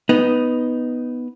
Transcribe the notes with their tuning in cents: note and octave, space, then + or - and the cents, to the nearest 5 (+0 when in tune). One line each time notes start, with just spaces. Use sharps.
B3 +0 D#4 +0